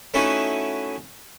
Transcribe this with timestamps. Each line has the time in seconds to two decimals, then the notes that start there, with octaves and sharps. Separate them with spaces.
0.14 A3 C#4 D#4 E4 F#4 A4